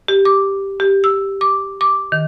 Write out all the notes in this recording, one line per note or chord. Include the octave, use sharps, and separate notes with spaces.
G4
D6
G4
E6
D6
D6
D#3